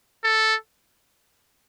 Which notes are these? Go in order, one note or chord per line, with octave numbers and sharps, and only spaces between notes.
A4